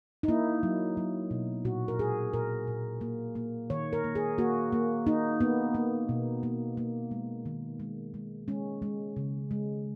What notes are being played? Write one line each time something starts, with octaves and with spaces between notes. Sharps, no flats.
D#4
A#3 E4
F#3
F#3
B2
A#2 F#4
A#4
A#2 G#4
A#2 A#4
A#2
A#3
A#3
D#3 C#5
A#4
A#3
G#4
A#3 F#4
A#3
A#3 D#4
A#3 B3
A#3
B2
A#3
A#3
G#3
D#3
G#3
G#3
G#3 C#4
G#3
C#3
G#3